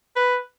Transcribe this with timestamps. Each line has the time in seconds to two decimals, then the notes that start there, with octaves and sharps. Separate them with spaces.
0.16 B4